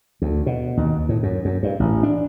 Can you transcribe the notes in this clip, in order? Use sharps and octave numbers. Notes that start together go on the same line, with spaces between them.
D2
B2
D#2
A2
F#2
F#2
G2
A1
D4